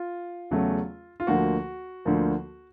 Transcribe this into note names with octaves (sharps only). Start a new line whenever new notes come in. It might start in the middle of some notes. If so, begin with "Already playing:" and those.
Already playing: F4
E2 C#3 F#3 A3
F4
D2 D3 F3 A#3 F#4
D2 D3 F3 A#3